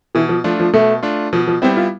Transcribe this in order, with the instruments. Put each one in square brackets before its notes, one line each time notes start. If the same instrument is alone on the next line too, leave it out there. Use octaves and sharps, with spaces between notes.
[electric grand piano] B2 [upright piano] E3
[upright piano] F3
[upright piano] F3 [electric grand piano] A3 D4 F4
[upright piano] F3
[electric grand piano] B2 [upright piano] A3
[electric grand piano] A3 D4 F4
[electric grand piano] B2 [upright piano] F3
[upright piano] F3
[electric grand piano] G3 B3 E4 [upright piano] C4
[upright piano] F4